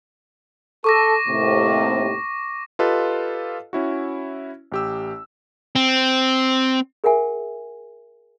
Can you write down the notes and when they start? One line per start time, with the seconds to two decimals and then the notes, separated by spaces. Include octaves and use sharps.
0.84 A4 C#6 D6 A#6
1.28 D#2 A2 C3
2.79 F4 G4 A4 B4 D#5 F5
3.73 C#4 E4 F#4
4.72 A1 G4 E6
5.76 C4
7.04 G#4 A#4 E5 F#5 G#5